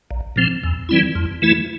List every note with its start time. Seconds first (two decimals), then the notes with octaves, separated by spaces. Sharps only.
0.11 A#1
0.36 A#2 F3 C4
0.63 E2
0.89 E3 G3 C4 E4
1.15 F2
1.42 E3 A3 E4